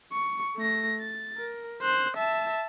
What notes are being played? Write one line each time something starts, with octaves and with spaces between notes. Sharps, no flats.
C#6
A3 A#6
A6
A#4
C5 F#6
E5 A5